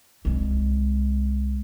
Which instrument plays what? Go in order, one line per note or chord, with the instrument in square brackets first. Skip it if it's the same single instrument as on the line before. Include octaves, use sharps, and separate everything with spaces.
[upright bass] C2 G#3